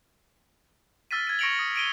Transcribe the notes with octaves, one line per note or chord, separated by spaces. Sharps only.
E6 F6 A6 B6 D#7
G#6 D#7
C#6 A#6 C#7 D7 F7 F#7
D#6
D7 D#7 G7